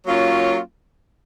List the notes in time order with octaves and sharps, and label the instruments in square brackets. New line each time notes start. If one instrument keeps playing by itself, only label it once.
[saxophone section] F#3 A#3 C#4 F4